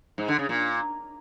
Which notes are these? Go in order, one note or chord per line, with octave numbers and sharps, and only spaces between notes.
G#2
D3
C#3
A#2